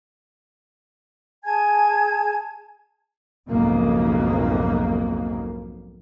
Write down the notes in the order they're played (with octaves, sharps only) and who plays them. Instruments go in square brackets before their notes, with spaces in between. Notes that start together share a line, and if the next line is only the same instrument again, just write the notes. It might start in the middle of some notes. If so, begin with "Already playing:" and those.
[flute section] G#4 G#5 A5 G#6
[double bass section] B1 F2 G#2 C#3 A#3